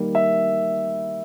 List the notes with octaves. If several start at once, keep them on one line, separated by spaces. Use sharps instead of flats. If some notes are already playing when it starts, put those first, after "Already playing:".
Already playing: D#3 G3 A#3
E5